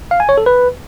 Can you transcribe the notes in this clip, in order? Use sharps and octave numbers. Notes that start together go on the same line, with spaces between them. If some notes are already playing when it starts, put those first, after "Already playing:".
F5
G#5
C#5
A4
B4